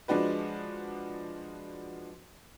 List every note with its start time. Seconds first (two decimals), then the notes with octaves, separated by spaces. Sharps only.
0.08 F3 G#3 D4 F#4 B4